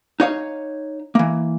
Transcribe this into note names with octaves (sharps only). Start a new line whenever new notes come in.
D#4 C#5 F5
E3 A#3